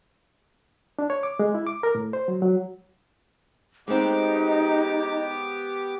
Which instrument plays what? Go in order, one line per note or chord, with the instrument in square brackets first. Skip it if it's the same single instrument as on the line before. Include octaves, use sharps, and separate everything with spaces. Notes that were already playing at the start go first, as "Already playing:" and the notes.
[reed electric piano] D4
C#5
D6
G#3
E4
D6
A#4
A2
C5
F#3
F#3
[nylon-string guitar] G#3 C4 [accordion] B3 G4 D6 [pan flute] D#4 [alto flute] D#5